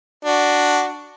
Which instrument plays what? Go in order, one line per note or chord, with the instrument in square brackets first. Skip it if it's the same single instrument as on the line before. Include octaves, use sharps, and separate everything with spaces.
[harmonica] D4 F#4